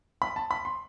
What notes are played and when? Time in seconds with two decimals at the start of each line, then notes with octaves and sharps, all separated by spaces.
0.22 B5
0.36 A5
0.51 B5
0.65 C6